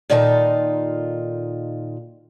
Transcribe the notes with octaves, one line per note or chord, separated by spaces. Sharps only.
A#2 D#3 D#4 F4 A4